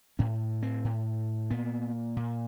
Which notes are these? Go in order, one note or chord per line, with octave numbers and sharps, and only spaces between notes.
A2 C#4
C4
A2
A#2 B3
A#2